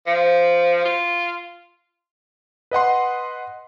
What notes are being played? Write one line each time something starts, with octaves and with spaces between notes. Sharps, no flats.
F3
F4
B4 D#5 F#5 C6